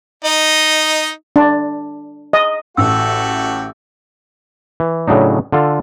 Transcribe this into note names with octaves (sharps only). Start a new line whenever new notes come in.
D#4 D#5
D4
D#5
A1 A3 F#4 G4 E6
E3
A2 C#3 F#3 D4 D#4
D3 F4 A4